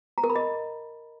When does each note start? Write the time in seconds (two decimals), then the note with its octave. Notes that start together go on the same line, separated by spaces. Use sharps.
0.18 A#5
0.24 A#4
0.30 B5
0.36 D#5